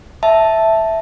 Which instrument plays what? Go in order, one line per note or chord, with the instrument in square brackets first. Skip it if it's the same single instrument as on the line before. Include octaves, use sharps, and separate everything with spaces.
[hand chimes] E5 A5